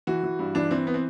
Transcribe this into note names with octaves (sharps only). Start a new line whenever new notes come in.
E3 F#4
E3
G2
E3 D4
E3 C4
B3
C4